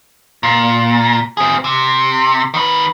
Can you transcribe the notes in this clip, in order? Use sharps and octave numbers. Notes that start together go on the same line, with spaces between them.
A#2
C4 G#4
C3
D#3 B4